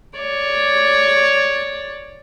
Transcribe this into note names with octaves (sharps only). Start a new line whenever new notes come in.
C#5 D5